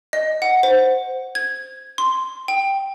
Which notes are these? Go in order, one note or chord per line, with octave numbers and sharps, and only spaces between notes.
D#5
F#5
C5
G#6
C6
G5